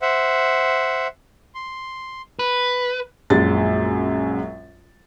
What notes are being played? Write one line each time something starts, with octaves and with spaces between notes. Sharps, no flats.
C5 E5 F#5
C6
B4
A#1 F#2 G#3 A6